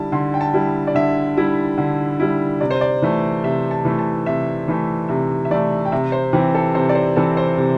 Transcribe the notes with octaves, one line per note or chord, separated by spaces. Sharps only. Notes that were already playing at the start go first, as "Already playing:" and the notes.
Already playing: D3 G3 E4 A5
D3 C6
G5
A5
G3 E4
D5
D3 E5
G3 E4
D3
G3 E4
C3 D5
C5
D5
E3 A3
C3 E5
A5
E3 A3
A5
C3 E5
E3 A3
C3 E5
E5
E3 A3 D5
G5
C3 E5
C5
E3 C4 G4
A4
C3 C5
D5
C5
E3 C4 A4
C5
C3